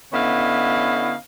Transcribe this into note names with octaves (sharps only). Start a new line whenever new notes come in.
D3 B3 C#4 E4 D#5 F5